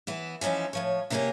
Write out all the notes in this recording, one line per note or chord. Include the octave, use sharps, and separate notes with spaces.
E3 B3 E4
E3 F3 C#4 D#4 E4
A2 F3 C#5
C3 D#3 A#3 C#4 G4 A#4